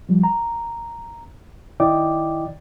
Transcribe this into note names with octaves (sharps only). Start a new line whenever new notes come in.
F3 G3
A#5
D#3 E4 D5 D#5 G5 D6